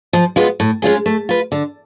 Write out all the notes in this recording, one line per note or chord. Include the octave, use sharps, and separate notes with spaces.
F3
G#3 B3 F4
A2
G#3 C#4 F4 G#4
A3
F4 B4
D3